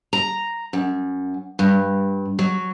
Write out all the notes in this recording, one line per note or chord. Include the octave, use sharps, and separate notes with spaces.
A#5
F#2
G2
F#3